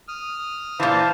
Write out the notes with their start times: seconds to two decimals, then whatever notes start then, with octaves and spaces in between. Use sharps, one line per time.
0.08 D#6 F6
0.80 A#2 E3 C5 F5 A5